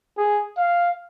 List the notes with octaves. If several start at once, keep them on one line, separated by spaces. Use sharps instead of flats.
G#4
F5